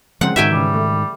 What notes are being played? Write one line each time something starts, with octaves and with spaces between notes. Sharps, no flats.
C#3 F3 G#3 C4 C5 F#5
G#2 D#3 D#4 F#4 E5 G5 G#5
C#3 E3 G3
A3